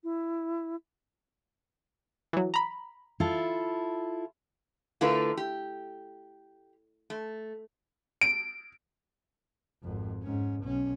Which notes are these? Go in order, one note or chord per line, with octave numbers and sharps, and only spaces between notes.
E4
E3 F#3
A#5 B5
E4 F4 A4
D3 A3 E4 F4 A#4 B4
G4
A3
D7
G#1 F2
G#2 C#4
B1 C#4